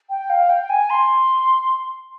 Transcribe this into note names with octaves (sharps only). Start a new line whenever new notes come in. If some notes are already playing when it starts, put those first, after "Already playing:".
G5
F5
G5
G#5
C6